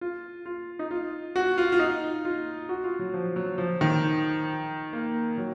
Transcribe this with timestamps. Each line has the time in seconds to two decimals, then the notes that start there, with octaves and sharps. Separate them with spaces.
0.01 F4
0.46 F4
0.79 D#4
0.91 F4
1.36 F#4
1.58 F4
1.72 F4
1.79 D#4
2.25 F4
2.69 F#4
2.84 F4
2.99 F#3
3.14 F3
3.36 F#3
3.58 F3
3.81 D#3
4.93 A#3
5.38 F#3